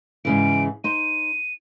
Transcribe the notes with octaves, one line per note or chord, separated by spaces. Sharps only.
G#2 C#3 E3 D7
D#4 C5 D#7